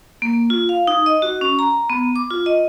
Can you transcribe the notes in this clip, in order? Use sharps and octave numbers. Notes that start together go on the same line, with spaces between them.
A#3
F4
F5
D#4
D#5
F#4
C#4
A#5
B3
D6
F4
D#5